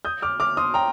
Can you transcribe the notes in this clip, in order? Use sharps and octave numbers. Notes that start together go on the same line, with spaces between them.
D#6 G6
D6 F6
D6 F6
C6 D#6
G5 A#5